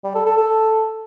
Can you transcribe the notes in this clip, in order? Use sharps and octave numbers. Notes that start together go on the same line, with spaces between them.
G3
A4
A4
A4